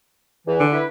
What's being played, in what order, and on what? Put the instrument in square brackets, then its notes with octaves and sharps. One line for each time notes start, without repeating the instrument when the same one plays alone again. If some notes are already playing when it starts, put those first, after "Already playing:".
[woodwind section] E2 E3
[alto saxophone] D3
[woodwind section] E4 B4